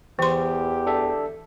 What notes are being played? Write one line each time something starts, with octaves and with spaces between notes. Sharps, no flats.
E2 E3 G4 C6
D4 A4 E5